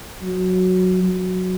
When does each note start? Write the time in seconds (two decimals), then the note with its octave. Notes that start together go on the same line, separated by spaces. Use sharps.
0.22 F#3
1.03 F#3